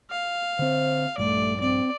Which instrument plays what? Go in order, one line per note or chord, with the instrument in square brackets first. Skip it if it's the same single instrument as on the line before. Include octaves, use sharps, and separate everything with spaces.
[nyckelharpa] F5
[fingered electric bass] D3 C4 [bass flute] C5
[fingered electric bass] A#1 G2 [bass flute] A3 [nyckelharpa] D5
[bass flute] C4 [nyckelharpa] D5